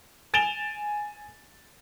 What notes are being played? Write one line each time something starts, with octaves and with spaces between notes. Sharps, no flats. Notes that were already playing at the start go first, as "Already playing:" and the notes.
G#5 A6 D7 E7 F7 G7